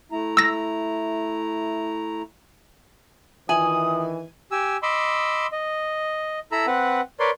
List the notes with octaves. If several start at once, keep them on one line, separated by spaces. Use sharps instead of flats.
A3 E4 A#5
E6 A#6
D#3 E3 F4 E5 G#5 D#6 F#7
G4 G#5 E6
D#5 B5 C6 D6 E6
D#5
E4 A4 A#5 B5 E6
C4 B4 F#5
A#4 B4 C#5 D5 C6